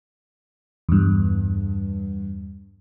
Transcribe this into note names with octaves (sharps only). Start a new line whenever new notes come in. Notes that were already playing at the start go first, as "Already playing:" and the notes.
E2 G2